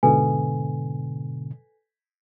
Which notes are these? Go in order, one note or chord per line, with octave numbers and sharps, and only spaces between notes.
G#2 B2 D3 A4 B4 G#5